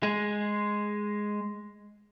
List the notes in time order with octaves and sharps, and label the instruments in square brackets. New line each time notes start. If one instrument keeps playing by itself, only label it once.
[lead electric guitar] G#3 G#4